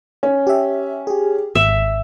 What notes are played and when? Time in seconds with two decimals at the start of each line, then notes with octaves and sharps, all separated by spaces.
0.23 C#4
0.47 G4 E5
1.07 G4 G#4
1.55 G#1 E5